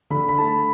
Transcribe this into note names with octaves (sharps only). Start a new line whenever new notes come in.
D3 B5
B5
A3 A5